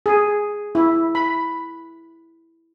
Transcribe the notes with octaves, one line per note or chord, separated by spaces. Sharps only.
G#4
E4
B5